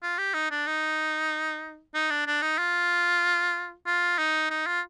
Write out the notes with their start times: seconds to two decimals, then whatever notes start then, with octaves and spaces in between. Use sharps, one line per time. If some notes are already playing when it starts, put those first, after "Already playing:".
0.02 F4
0.18 G4
0.34 D#4
0.51 D4
0.67 D#4
1.94 D#4
2.10 D4
2.27 D4
2.42 D#4
2.58 F4
3.87 F4
4.18 D#4
4.50 D#4
4.66 F4